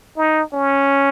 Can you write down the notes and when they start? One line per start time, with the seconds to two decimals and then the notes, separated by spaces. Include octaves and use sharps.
0.17 D#4
0.54 C#4